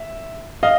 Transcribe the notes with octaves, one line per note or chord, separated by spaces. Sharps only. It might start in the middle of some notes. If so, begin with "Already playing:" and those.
Already playing: E5
D#5 F5